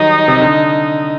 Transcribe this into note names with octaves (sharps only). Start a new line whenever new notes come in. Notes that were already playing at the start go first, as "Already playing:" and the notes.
Already playing: D#3 F#3 G3 D#4
C3
D3